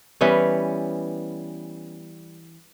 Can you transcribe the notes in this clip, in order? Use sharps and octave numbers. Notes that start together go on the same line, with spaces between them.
E3 G3 B3 C#4